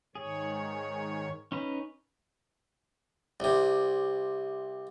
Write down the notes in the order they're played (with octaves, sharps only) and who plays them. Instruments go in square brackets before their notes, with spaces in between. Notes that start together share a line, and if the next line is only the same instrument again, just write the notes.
[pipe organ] G#2 D#3 C#5 [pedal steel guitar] G#4
[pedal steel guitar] C#4 D#4 B4
[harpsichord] C2 C3